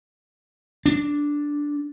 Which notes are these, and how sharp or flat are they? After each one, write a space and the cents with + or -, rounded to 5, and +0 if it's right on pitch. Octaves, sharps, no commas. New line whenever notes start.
D4 -5